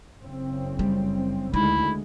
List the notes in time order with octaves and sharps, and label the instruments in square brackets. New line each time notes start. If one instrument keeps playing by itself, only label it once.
[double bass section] F#1 C#3 C4
[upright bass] G3
[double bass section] D2 G#3 [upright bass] D#4 [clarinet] E4